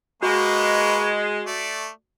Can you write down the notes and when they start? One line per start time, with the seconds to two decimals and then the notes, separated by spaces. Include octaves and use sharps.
0.23 G#3 A#3 F#4 B4 C#6
1.47 A3 D5